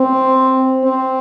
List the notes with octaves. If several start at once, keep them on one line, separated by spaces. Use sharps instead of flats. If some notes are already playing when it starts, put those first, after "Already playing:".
Already playing: C4
C4